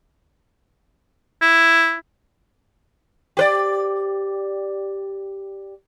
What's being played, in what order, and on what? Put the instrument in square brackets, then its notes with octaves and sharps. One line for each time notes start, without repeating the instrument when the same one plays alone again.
[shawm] E4
[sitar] G4 B4 D5